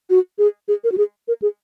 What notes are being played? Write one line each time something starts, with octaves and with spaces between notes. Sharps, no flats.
F#4
G#4
G#4
A#4
F#4
G#4
A#4
G#4